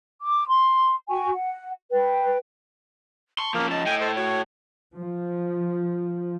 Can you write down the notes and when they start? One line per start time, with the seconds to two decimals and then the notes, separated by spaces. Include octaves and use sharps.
0.21 D6
0.48 C6
1.10 F#4 G5 G#5 C#6
1.30 F#5
1.92 B4 G5
3.38 A5 C6 C#6
3.54 F3 A#3 C#4
3.70 D#5 A5
3.86 A2 G5 G#5
4.01 A4 C5
4.16 F#4 C#5
4.95 F3